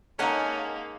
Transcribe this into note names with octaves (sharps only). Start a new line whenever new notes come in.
G#3 A#3 C#4 D#4 A4 F#5 G#5